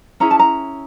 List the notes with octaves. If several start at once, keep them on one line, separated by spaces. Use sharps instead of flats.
C#4 E4 G#4 A#5
A5
A#5